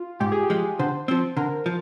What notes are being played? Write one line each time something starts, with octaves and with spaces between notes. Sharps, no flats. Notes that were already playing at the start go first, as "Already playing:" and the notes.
Already playing: F4
G#2 G4
G#4
G4
F3 G#3
D3 C5
F3 C4
D3 A#4
F3